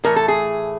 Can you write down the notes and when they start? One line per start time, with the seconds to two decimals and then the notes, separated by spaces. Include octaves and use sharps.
0.04 A2 E3 A3 A#4
0.16 A4
0.28 G#4